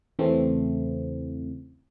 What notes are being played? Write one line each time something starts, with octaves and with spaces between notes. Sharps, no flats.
E2 C#3 E3 A3 C4